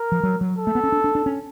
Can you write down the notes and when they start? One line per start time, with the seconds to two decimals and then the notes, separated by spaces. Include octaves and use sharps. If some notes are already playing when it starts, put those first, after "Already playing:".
Already playing: A#4
0.12 F3
0.23 F#3
0.41 F#3
0.58 A4
0.67 A3
0.75 B3
0.84 C#4
0.92 D4
1.04 D4
1.15 D4
1.26 C#4